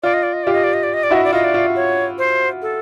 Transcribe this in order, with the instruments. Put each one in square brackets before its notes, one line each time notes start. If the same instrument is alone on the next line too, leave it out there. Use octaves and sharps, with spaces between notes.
[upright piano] F4 [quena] D5
[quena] D#5
D5
D#5
[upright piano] F4 G4 [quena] D5
[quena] D#5
D5
D#5
D5
D#5
D5
[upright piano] E4 F#4 [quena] D#5
[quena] D5
[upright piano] F4 [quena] D#5
[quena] D5
[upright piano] F4
[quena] C#5
C5
A4